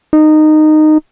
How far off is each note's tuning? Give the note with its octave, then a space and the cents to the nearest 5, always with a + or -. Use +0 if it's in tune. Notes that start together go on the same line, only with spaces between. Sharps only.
D#4 -15